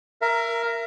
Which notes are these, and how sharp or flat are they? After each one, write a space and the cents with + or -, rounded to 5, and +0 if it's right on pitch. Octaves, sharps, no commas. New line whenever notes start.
A#4 +0 E5 +30